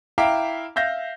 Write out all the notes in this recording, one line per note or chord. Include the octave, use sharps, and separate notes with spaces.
E4 E5 F5 G5 A#5 D6
E5 F5 G6 A#6